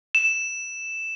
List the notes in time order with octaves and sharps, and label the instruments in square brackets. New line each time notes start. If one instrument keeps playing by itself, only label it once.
[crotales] E7